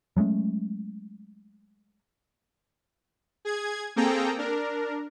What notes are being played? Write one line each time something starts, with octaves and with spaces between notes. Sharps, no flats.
F#3 G#3 A3 C#4
G#4 G#6
A#3 C4 G#4 A4 G5 A#5
D4 A#4